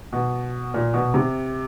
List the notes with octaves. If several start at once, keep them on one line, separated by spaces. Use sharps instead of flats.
B2
A#2
B2
C3